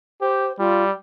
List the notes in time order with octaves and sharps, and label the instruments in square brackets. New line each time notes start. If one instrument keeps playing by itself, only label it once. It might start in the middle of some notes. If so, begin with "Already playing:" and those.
[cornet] G4 [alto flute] C5
[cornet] G3 [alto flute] F4